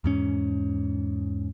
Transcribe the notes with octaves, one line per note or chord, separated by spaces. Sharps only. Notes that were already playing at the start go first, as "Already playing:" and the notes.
E2 G#2 C#4